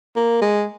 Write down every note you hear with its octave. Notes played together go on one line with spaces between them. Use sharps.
A#3
G#3